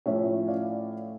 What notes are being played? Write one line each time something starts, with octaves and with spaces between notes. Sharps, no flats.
A2 F3 A3 C#4 C#5 E5
D5 F5